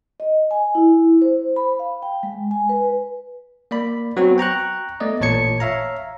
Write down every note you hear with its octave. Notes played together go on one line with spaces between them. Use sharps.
D#5
G#5
E4
C5
B5
F5
G5
G#3
G#5
B4
A#3 D5 B5
F#3 B3 C4 F#4
G5 A#5 C#6 F#6
A3 B3 D5 D#5
A1 A#2 C#5 A5 G#6 C#7
C#5 E5 F5 A#5